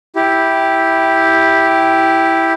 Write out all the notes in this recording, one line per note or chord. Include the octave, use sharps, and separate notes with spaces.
E4 G4